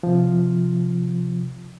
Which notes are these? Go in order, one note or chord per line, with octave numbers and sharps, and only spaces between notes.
C3 F3